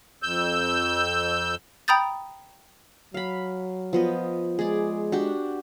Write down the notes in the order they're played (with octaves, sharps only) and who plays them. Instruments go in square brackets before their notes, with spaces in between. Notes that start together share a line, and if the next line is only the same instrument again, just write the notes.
[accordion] F2 E6 G6
[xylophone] G5 A#5 B5 D#6 G6 A6
[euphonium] F#3 [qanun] F5 B5
[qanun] F3 B3 D#5
[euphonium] G#3 [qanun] G#4 D5
[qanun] D4 F#4 G4